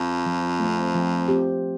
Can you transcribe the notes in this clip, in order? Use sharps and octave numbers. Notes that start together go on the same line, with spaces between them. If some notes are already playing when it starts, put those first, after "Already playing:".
Already playing: F2
F3
A3 C4
F3
C4 G4